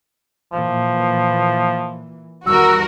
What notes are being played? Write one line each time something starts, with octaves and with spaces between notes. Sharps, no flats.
A#2 E3 F3
E2 D#3 G3 F#4 A#4 E6